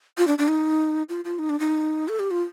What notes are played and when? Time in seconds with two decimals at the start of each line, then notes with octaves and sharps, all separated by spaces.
0.18 F4
0.27 D4
0.38 D4
0.48 D#4
1.09 F4
1.25 F4
1.39 D#4
1.49 D4
1.60 D#4
2.08 A4
2.19 G4
2.31 F4